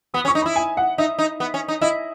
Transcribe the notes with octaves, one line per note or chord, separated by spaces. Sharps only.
B3 D#6
C#4
C#6
D#4
E4 B5
G#5
F#5
D#4 E5
D#4
B3
C#4
D#4
E4 D#5